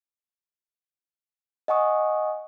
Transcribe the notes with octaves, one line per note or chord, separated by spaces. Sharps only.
D#5 F#5 G#5 C#6 D#6